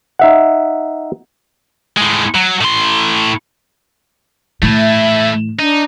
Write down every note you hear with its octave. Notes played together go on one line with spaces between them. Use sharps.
D#4 E5 F#5
A2 G#3
F#3
A2 C6
A2 E3 A3 E4
E5
D4 D#4